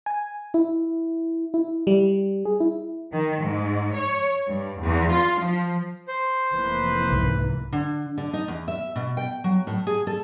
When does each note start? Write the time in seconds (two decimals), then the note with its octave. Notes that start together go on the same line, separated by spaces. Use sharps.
0.06 G#5
0.54 E4
1.54 E4
1.87 G3
2.45 G#4
2.60 E4
3.11 D#3
3.41 G#2
3.93 C#5
4.45 G2
4.78 E2
5.08 F4
5.39 F3
6.08 C5
6.51 F1 E3 A#3 B4
7.12 C2 G#2
7.73 D3
8.18 D3
8.33 D#4
8.48 E2
8.68 E5
8.96 B2
9.17 G5
9.44 F#3
9.67 A2
9.87 G#4
10.07 A4